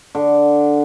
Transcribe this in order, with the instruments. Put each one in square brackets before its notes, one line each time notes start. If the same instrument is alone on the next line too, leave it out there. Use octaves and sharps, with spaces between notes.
[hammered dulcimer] D3